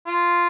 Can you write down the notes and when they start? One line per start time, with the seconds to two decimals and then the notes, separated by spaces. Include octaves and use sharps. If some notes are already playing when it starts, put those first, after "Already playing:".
0.07 F4